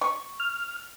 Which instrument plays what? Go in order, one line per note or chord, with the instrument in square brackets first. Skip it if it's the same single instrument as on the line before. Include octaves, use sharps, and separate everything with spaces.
[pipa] C#6
[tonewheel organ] F6